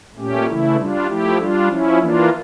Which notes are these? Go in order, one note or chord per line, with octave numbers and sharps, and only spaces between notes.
A#2 A3 C#4 G4
C#3 E3 A3 E4
G3 D4 F4
F3 A3 E4 G4
G3 D4 F4
F3 C#4 E4
E3 A#3 D4 F4